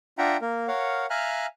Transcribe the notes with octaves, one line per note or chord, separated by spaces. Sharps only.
D4 F4 E5 F#5 G5 A#5
A#3 A#4
A#4 C#5 F5 F#5
E5 F5 G#5 A#5 F6 F#6